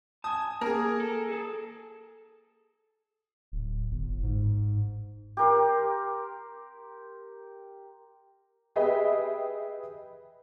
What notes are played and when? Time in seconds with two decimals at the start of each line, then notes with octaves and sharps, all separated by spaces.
0.24 G#5 A5 D#6
0.61 A#3 G#4 A#4
1.00 A4
1.29 G#4 A4
3.52 D1
3.91 G1
4.23 G#2
5.37 G4 A#4 C6
8.76 G4 G#4 B4 D#5 E5 G5